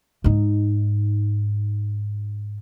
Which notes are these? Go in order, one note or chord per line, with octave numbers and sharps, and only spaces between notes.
G#2 D#4